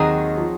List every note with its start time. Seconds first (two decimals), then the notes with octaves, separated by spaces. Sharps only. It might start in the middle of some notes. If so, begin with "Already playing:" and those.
Already playing: D#2 D#3 F#3 C4 D#4 G#4 D#5
0.38 F3